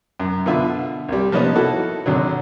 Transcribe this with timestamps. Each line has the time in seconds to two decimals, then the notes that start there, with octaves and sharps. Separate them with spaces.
0.20 F#2
0.46 B2 D3 F4 E5
1.09 C2 G3
1.32 F3 A#3 B3 C#4 D#4
1.56 E4 F#4 A4
2.06 G#1 D3 F#3